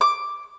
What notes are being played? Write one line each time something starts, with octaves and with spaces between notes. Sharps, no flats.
D6